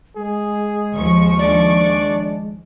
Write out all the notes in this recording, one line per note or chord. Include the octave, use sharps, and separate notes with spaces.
G#3 G#4
D#2 F3 C#6
D4 D5